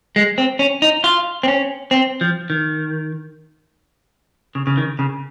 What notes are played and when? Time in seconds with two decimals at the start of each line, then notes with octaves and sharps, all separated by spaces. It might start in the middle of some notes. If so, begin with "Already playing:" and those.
0.16 G#3
0.38 C4
0.59 C#4
0.82 D#4
1.04 F4
1.43 C4
1.48 C#4
1.91 C4
2.21 F3
2.50 D#3
4.55 C#3
4.67 C#3
4.77 D#3
4.99 C#3